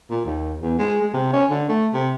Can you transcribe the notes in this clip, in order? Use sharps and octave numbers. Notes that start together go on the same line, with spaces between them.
A#2
D#2
E2
G#3
G#3
C3
C#4
D3
A3
C3